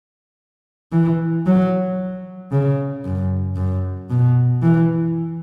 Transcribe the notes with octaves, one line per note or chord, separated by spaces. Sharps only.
E3
F#3
C#3
F#2
F#2
B2
E3